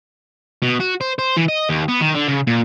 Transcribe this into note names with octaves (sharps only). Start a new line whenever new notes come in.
B2
F#4
C5
C5
E3
D#5
D#2
B3
D#3
D3
C#3
A#2